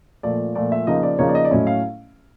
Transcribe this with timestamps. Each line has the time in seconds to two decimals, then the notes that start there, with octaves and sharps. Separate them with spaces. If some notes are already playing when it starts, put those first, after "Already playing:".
0.23 A#2 F3 A3 D5
0.55 A#2 F3 A3 D5
0.72 E5
0.87 C#3 F3 A#3 D#4 D#5
1.03 D5
1.19 C#3 F3 A#3 D#4 C#5
1.29 D5
1.35 D#5
1.45 D5
1.51 A2 F#3 A3 C#4 E4 D#5
1.67 F5